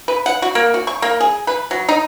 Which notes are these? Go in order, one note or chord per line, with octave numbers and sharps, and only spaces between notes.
B4
F#5
F#4
A#3
F#4
C#6
A#3
G#4
B4
F#3
D#4